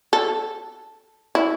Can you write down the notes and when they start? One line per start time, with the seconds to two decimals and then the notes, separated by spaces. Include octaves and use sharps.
0.13 A4
1.35 E4